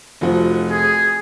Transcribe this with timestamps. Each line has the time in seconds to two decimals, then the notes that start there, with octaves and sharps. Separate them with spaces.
0.21 F1 F3 F#4
0.70 G#4